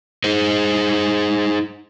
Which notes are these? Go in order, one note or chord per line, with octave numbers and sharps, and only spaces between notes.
D#4 G#4 C5